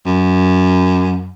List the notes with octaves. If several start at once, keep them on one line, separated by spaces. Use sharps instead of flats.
F#2